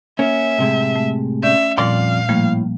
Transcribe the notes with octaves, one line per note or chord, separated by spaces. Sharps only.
A#3 C#4 E5
A2 C3 G#3
A3
C#4 D5 E5 G6
F2 A#2 G3 D5 F5 C6
A2 F3 G3 A#3